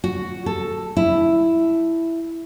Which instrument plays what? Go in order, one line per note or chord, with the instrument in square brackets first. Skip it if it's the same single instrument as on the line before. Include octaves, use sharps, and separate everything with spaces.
[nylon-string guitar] F#4
A4
E4